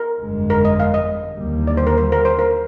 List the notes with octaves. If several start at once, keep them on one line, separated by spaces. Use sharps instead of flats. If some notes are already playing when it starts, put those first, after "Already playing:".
Already playing: A#4
G1 F2 D3 G#3
A#4
D#5
F5
D#5
D#2 D3 G3 A#3
D5
C5
A#4
C5
A#4
C5
A#4